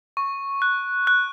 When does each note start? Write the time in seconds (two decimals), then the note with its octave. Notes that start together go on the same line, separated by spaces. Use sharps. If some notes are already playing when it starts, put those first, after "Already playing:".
0.17 C#6
0.62 F#6
1.07 F#6